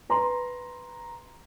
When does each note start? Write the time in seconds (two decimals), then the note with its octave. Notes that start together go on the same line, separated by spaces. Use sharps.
0.09 B4 A#5 C6